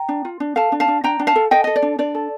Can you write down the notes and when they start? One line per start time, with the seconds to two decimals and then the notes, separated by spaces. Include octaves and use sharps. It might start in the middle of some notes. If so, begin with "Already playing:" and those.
Already playing: G5 A#5
0.09 D4
0.25 F4
0.40 D4
0.56 A4 F5 A5
0.72 D4
0.80 F5 A5
0.88 D4
1.04 D4 G5 A#5
1.19 D4
1.27 F5 A5
1.36 A4
1.51 A4 D#5 G5
1.64 A4 D#5
1.76 D5
1.82 D4
1.99 D4 D5
2.15 A4